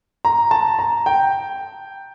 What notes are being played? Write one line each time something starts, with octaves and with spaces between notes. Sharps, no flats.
A#5
A5
A#5
G5